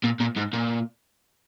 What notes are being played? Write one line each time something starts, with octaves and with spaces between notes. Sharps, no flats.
A#2
A#2
G#2
A#2